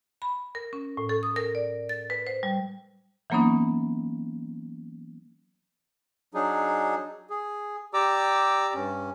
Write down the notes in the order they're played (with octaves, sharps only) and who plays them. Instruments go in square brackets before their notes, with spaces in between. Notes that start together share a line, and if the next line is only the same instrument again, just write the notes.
[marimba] B5
A#4
C#4
A2
A4
D#6
A#4
D5
A6
B4
C5
G3
E3 F#3 A#3 B3 C#4 D#4
[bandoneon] F#3 D4 D#4 G#4
G#4
G4 D5 A#5 D6 E6
G2 C#4